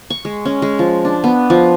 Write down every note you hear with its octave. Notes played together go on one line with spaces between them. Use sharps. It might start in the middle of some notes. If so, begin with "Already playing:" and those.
C#6
G#3
C#4
G#3
F3
D4
B3
F3